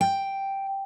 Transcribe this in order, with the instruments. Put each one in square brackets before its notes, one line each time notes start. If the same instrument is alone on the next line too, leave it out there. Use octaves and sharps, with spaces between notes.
[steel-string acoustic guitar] G5